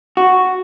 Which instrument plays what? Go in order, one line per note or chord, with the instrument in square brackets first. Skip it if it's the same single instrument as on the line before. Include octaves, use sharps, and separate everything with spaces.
[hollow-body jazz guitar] F#4